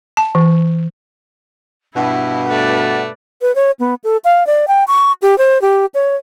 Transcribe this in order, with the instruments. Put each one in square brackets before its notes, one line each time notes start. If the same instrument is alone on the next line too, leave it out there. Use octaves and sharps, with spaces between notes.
[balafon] A5
E3
[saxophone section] G2 B2 [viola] E4 [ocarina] F#5
[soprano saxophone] A3 [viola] B4 D5
[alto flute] B4
C#5
B3
A4
F5
D5
G5
C#6
G4
C5
G4
C#5